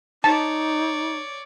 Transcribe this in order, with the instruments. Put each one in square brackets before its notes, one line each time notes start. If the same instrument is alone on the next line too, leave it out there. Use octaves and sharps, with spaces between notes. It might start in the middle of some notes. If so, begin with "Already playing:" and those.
[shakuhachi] D#4 [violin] C#5 D5 [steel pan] A5